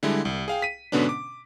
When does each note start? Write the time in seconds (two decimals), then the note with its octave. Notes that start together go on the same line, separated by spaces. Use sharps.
0.03 D3 G3 G#3 E4
0.25 C2
0.48 G#4 F5 G5
0.62 B6 D#7
0.92 G#2 B2 D3 B3 C#4 D4
1.09 D6